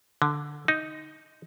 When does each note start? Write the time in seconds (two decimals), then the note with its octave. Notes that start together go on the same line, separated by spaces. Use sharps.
0.22 D3
0.68 D#4